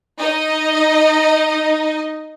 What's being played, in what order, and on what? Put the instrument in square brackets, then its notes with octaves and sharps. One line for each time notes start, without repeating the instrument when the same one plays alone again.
[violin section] D#4 D#5